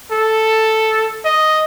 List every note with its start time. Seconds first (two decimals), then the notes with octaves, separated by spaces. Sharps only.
0.11 A4
1.25 D#5